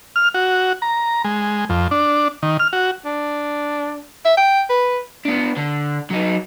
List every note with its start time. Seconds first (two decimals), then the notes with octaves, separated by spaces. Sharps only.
0.16 F6
0.34 F#4
0.82 A#5
1.24 G#3
1.69 F2
1.91 D4
2.43 D#3
2.60 F6
2.73 F#4
3.05 D4
4.25 E5
4.37 G5
4.70 B4
5.25 B3 D4
5.57 D3
6.11 F#3 D#4